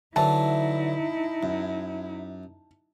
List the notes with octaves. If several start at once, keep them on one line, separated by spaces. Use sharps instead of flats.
D3 E3 F#3 D#4 E4 A5
F#2